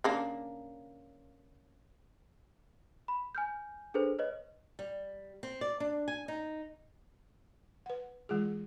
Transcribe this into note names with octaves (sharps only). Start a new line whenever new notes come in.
C#3 A#3 D4
B5
G#5 F6 G6
D4 G#4 A4 B4 C5
B4 C#5 D#5
G3
C4
D5
D4
G#5
D#4
B4 F#5
E3 G#3 F4 G#4